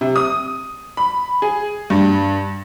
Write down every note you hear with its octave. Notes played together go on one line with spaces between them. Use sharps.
C3
D#6
B5
G#4
G2